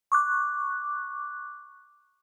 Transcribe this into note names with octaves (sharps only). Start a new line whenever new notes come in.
C#6 D6 F#6